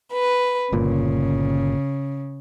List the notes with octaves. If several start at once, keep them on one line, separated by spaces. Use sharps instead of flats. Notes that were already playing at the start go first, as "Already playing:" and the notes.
B4
G1 A#2 C#3